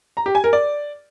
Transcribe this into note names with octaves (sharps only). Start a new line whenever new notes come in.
A#5
G4
G#5
A#4
D5